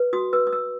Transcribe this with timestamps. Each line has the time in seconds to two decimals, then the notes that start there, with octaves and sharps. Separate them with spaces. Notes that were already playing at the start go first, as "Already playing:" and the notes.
Already playing: B4
0.13 F#4 D#6
0.33 B4 E6
0.47 D#6
0.52 C#5 E6